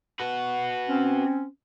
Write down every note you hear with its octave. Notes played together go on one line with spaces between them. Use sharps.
F#4 B4
C4 C#4